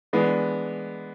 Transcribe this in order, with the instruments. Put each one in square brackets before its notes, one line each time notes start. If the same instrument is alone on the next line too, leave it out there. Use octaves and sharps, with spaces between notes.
[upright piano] E3 G#3 B3 D4